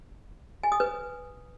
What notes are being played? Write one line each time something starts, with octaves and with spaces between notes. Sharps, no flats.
G#5
D#6
B4